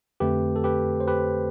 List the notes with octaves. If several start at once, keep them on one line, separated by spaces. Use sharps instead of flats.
F2 D3 A3 C4 G4 B4
A4
G4 B4
C5
G4 B4